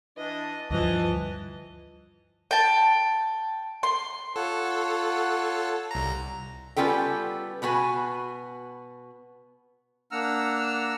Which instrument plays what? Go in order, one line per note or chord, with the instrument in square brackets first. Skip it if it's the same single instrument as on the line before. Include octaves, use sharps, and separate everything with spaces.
[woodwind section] E3 D4 [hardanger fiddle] D#5
[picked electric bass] D2 G2 F3 [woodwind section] E3 [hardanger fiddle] D#5 A5
[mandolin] G5 A5
C6
[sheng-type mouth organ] F4 C#5 F#5 [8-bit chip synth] A4
[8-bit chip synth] C2 A#5
[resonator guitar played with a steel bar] G3 B3 C#4 F4 A4 G5
B2 B3 F#4 G#5
[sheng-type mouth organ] A#3 D4 F#5 A#5 E6 F6